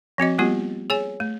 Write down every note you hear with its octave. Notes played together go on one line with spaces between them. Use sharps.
F3 C4 F#4 D#5
G3 A#3 B3 F4 G4
G#4 C#5 G#5
A3